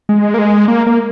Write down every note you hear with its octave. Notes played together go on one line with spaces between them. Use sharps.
G#3
A#3
G#3
A#3
A#3